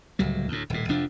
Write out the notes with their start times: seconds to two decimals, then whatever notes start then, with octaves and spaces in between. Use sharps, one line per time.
0.19 D1 C#2 F#3 G3
0.48 D2 A2
0.70 D#1 A2
0.89 F1 F2 F3 D4